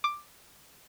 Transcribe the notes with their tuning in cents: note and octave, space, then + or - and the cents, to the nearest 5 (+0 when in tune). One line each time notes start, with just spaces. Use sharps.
D6 +10